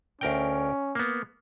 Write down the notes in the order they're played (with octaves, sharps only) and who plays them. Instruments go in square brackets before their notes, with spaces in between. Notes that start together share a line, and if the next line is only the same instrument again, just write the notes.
[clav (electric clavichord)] D2 A#4 G5 [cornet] C#4
[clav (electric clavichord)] A#3 B3